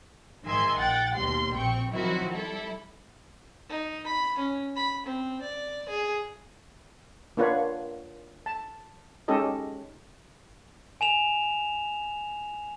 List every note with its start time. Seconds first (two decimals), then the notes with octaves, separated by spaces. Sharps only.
0.45 G#2 D#3 E5 G#5 C6
0.76 A#1 F#5 G5 A6
1.16 D#2 B2 G3 C6
1.55 A#1 C4 G5 C#6
1.91 D#3 F3 F#3 C4 E4 F#4
2.31 G3 E4 A4
3.70 D#4
4.06 B5
4.39 C#4
4.76 B5
5.06 C4
5.42 D5
5.89 G#4
7.37 A#3 D4 F4 B4 C#5 F#5
8.46 A5
9.28 G#3 C#4 D#4 G4 A4 D#5
11.01 G#5 E7 F7